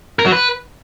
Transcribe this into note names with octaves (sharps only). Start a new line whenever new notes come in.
A#4
F#3
B4